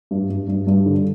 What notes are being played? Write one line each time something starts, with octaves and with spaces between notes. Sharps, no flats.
G2
G2
G2
G2
D3